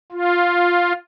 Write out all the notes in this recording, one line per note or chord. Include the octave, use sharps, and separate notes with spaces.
F4